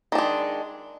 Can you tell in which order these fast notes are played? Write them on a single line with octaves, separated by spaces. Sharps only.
D#3 D4 G#3